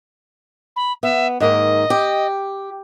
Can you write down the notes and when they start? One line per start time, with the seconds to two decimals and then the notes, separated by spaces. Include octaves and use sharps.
0.76 B5
1.03 B3 E5
1.40 G#2 D#3 A#3 D#5
1.90 G4